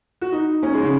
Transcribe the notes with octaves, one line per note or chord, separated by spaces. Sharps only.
F#4
D#4
C#4
G#3
C#3